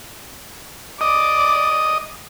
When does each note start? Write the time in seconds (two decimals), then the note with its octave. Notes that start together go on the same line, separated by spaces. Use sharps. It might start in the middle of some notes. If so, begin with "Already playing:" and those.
1.01 D5 D#5 D6